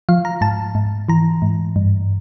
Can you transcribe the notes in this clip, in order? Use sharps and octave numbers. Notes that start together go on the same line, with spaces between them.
F3 F5
A#5
G#2 A5
G#2
E3 A#5
G#2
G2